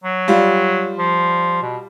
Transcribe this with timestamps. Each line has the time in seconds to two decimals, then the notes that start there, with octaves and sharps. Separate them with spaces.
0.04 F#3
0.28 G3 F4
0.98 F3
1.62 B2